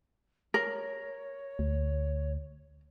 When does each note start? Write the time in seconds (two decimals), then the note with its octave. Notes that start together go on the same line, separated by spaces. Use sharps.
0.54 A#4 C#5
1.59 D2